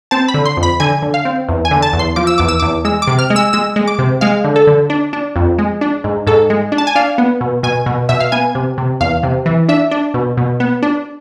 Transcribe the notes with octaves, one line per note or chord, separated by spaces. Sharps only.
C4 A5
B5
D3
C6
F2
B5
D3 G#5
D3
F5
C4
E2
G#5
D3
A5
E2
C6
F3 D6
E6
E2 D6
E6
E2 D6
G#3 E6
D6
C3
F6
G#3
E6
G#3 E6
G#3
D6
C3
G#3 F5
D3
A4
D3
D4
D4
F2
G#3
D4
G#2
G#2 A4
G#3
D4
A5
G#5
D4 F5
B3
B2
B2 G#5
B2
B2 E5
F5
B3 G#5
C3
C3
E2 F5
C3
E3
D4 E5
D4
B2
B2
B3
D4